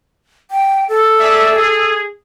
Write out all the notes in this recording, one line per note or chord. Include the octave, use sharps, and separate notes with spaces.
G5
A4
G#4 D5 E5
G#4